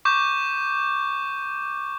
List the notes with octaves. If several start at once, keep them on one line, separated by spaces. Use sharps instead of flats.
C#6 D6 G6